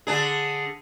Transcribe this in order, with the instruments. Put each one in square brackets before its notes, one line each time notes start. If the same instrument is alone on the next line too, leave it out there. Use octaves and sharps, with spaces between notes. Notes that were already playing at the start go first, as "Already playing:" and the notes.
[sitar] D3 D4 G#4